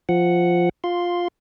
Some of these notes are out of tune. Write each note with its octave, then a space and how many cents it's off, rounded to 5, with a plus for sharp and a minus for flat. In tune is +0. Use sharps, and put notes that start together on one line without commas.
F3 +0 F#5 +0
F4 +10 C6 +0